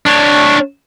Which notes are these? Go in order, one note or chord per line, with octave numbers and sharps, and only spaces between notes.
D4 C#5